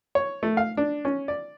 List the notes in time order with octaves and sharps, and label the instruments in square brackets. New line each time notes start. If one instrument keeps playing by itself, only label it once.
[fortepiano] C#5
A3
F5
D4
C#4
D5